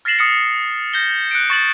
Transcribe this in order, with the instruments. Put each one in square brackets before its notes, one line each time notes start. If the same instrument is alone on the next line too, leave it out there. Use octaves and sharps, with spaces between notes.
[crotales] F6 A6 A#6 C7 E7 F#7
D#6 F6 C#7
G6 A#6 G7
F#6 C#7 D7
C#6 A6 F#7